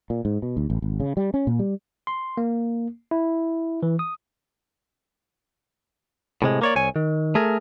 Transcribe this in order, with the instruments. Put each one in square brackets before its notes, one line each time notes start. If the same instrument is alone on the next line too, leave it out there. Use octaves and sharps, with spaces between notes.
[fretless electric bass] A#2
G#2
B2
D2
A1
G#1
C#3
G3
C#4
A#2
G3
[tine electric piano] C6
A#3
E4
E3
D#6
[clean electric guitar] A2 C3 G#3
A#3 C#5 D5
C2 C#5 G#5
D#3
A3 G#4 A#4